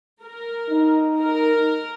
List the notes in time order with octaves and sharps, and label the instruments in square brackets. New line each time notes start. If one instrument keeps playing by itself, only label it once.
[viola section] A#4
[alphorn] D#4
[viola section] A#4